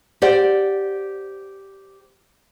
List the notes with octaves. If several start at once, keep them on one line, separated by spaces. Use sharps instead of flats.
G4 C5 D5 F#5